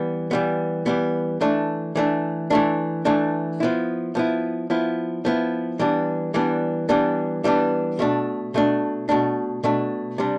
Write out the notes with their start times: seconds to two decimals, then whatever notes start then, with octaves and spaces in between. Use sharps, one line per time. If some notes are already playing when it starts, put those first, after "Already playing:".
Already playing: E3 G3 B3
0.31 E3 G3 B3
0.86 E3 G3 B3
1.41 E3 A3 D4
1.95 E3 A3 D4
2.50 E3 A3 D4
3.05 E3 A3 D4
3.60 F3 B3 E4
4.15 F3 B3 E4
4.70 F3 B3 E4
5.25 F3 B3 E4
5.79 E3 G3 B3 D4
6.34 E3 G3 B3 D4
6.89 E3 G3 B3 D4
7.44 E3 G3 B3 D4
7.99 B2 A3 D4
8.54 B2 A3 D4
9.09 B2 A3 D4
9.63 B2 A3 D4
10.18 C3 G3 D4